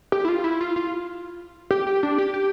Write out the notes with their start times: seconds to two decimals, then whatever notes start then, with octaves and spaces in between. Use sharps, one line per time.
0.12 G4
0.25 E4
0.29 F4
0.44 E4
0.61 F4
0.76 F4
1.71 G4
1.87 G4
2.03 D4
2.18 G4
2.34 G4